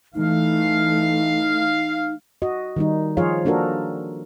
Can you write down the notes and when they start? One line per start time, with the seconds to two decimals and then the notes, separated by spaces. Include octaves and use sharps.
0.15 E3 A3 D#4 F5
2.42 F#4 D#5
2.76 D#3 G3 D#4
3.17 F3 F4 G#4 C#5 F5
3.45 A#3 D4 F#4 A4 A#4